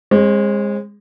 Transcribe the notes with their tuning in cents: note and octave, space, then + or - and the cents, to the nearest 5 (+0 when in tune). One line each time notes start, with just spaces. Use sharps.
G#3 -20 C4 +40